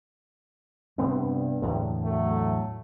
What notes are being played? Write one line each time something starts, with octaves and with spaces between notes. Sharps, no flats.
G2 C3 B3 C4
E2 A2 D3
F#3 A3